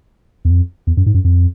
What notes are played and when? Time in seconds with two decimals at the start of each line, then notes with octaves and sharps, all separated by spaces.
0.45 E2
0.50 F2
0.87 E2
0.97 F#2
1.06 G#2
1.14 F#2
1.24 F2